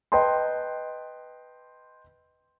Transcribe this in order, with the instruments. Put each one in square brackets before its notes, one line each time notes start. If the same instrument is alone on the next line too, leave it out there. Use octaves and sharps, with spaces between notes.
[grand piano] B4 D#5 G5 A5 C6